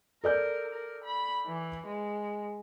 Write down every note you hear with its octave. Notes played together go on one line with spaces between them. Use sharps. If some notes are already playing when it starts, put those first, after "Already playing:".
A4 A#4 D5 G6
A#4
B5
E3
G#3